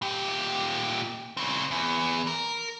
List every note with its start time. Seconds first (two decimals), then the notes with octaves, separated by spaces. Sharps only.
0.02 A#2 G4
1.37 C#3 C4
1.71 E2
2.27 A#4